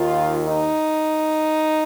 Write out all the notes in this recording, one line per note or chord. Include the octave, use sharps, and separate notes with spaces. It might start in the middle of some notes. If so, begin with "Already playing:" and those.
Already playing: D#2 D#3 F4
D#4